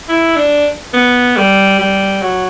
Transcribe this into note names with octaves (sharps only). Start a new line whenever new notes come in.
E4
D4
B3
G3
G3
F#3